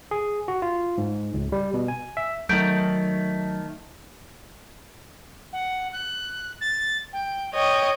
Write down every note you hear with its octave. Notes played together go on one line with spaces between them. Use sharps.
G#4
F#4
F4
G#2
C#2
G3
B2
G#5
E5
D#3 F#3 A3 G6 D7
F#5
F#6
A6
G5
C#5 D#5 G5